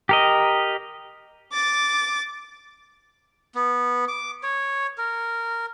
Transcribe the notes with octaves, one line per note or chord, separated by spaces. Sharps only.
G4 A#4 D#5
D6 A6
B3
D6
C#5
A#4